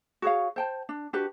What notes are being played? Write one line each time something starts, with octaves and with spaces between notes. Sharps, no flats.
F#4 G#4 C#5 F5
C5 G5 A5
D4
D4 F#4 G4 B4